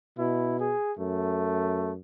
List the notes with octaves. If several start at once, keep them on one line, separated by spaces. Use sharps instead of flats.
B2 E4
G#4
F#2 A3